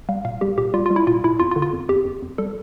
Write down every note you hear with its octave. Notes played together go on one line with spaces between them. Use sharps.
G3 F5
A#2 F5
G3 G4
A#2 G4
G3 F4
G3 F4
E4
A#2 F4
A#2 E4
F2 F4
F4
D3
F4
F2
F2 G4
F2
F2
G3 A4